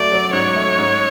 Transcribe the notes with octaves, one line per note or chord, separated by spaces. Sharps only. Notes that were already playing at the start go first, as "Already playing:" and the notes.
Already playing: F#3 A3 D5
F#3
G#2 C#5
A3
G#2